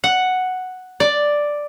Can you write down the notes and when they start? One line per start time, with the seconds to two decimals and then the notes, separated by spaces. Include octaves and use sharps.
0.04 F#5
1.00 D5